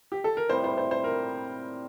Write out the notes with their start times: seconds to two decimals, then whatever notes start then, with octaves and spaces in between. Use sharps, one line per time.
0.12 G4
0.24 A4
0.37 A#4
0.49 A2 G3 C4 E4 C5
0.64 C5
0.78 C5
0.91 C5
1.04 A#4